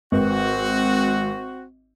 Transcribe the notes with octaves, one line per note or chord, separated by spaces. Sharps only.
G#1 C4 F#4 B4